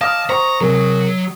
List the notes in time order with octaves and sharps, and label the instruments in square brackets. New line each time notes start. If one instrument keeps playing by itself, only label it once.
[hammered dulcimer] D#5 [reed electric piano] F5 D6 F6 [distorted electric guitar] A5
[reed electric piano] C5 [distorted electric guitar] A#5 [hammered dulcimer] C#6
[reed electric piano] C3 G#4 A#4 [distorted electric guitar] F#3